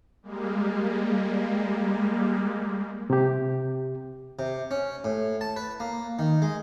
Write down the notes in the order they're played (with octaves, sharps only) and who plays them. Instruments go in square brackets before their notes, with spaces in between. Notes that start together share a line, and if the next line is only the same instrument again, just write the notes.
[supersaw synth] G3 G#3 A#3
[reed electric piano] C3 G4
[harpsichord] C3
C#4
A2
A5
B4
A#3
D#3
G#3